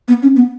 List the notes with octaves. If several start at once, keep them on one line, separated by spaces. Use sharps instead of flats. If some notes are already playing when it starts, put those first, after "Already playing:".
B3
C#4
B3